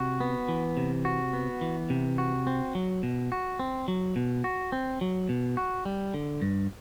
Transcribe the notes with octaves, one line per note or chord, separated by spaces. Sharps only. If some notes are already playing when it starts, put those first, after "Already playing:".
Already playing: C3 F#4
B3
E3
C3
F#4
B3
E3
C3
F#4
C4
F#3
B2
F#4
C4
F#3
B2
F#4
C4
F#3
B2
F#4
G3
D3
G2